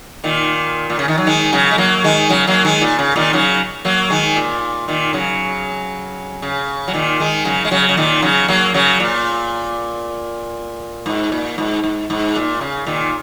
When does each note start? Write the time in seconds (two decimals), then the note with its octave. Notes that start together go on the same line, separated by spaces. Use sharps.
0.24 A#2 D#3
0.90 A#2
0.99 C#3
1.08 D#3
1.18 F#3
1.27 D#3 G#3
1.53 C#3 F#3
1.71 G#3
1.78 F#3 A#3
2.04 D#3 G#3
2.30 C#3 F#3
2.47 F#3 A#3
2.65 D#3 G#3
2.81 A#2
2.99 C#3
3.16 A#2 D#3
3.33 C#3 F#3
3.85 F#3 A#3
4.10 D#3 G#3
4.36 A#2
4.88 A#2 D#3
5.13 C#3 F#3
6.42 C#3
6.88 F#3
6.94 A#2 D#3
7.20 D#3 G#3
7.45 C#3 F#3
7.65 G#3
7.71 C#3 F#3
7.89 C#3
7.97 A#2 D#3
8.22 C#3 F#3
8.48 F#3 A#3
8.74 C#3 F#3
9.00 A#2
11.06 G#2
11.32 A#2
11.58 G#2
11.84 G#2
12.10 G#2
12.36 A#2
12.61 C#3
12.87 A#2 D#3